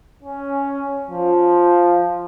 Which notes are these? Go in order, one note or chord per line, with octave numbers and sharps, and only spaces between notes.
C#4
F3